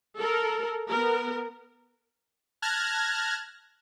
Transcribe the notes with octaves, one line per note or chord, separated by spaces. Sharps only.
A4 A#4
B3 A#4
A5 F6 F#6 G#6 A#6